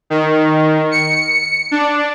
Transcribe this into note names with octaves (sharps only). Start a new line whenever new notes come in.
D#3
C#7
D4